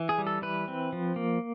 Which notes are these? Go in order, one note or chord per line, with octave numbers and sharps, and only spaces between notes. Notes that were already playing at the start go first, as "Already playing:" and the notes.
Already playing: E3
G#4
G3
A4
E3 B4
C4
F3
A#3